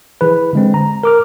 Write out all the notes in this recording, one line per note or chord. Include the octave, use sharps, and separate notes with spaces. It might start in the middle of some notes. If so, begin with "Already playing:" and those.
E3 G#4 B4
D3 G#3 C4
A#5
A#4 D6 F6